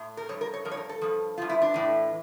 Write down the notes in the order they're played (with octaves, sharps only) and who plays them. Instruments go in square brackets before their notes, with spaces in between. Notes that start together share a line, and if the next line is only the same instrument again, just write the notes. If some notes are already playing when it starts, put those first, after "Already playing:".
Already playing: [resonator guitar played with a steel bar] A2
A#4
G2 F3 C#5
A#4
C#5
G2 F3 A#4
C#5
A#4
A4
G2 F3
G2 F3 F4
E4
D4
A2 E3